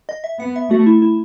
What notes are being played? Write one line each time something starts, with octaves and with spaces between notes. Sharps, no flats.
D#5
E5
B3 F#5
E5
A3 F#4
E4
E4